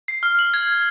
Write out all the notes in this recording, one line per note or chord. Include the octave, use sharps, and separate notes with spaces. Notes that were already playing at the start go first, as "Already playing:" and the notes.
C7
F6
F#7
G#6